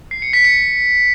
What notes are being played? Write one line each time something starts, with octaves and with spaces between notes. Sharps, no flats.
C7
C#7
B6
C#7